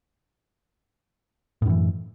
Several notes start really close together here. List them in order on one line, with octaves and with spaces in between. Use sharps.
A2 F#2 E3